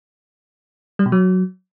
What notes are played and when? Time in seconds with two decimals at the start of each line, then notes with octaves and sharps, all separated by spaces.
0.99 G3
1.06 B2
1.12 F#3